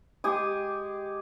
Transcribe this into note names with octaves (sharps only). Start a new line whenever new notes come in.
G#3 G4 G#5 D#6